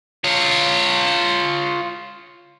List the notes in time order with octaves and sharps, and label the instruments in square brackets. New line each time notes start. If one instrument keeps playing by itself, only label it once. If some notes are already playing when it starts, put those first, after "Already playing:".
[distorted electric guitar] F4 C#5